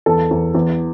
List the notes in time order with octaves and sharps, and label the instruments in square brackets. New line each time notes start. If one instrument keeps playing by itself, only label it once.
[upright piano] E2 A4
E2
E2